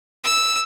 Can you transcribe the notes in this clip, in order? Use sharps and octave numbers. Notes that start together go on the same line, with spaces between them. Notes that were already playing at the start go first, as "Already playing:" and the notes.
E6